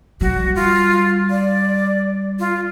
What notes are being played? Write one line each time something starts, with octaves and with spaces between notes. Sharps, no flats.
G3 F#4
F4
D5
F4